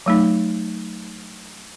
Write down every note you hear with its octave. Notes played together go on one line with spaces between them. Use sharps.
F#3 A3 D#4